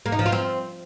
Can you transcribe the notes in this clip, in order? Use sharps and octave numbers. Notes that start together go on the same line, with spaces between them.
A#3
D#4
F3
F4
C4